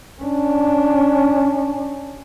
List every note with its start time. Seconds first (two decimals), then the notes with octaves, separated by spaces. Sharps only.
0.22 C#4 D4